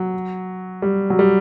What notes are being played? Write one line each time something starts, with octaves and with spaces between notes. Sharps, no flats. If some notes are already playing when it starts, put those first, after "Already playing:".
Already playing: F#3
G3
F#3
G3